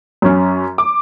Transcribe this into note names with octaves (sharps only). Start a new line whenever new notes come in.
F#2 C#4
D6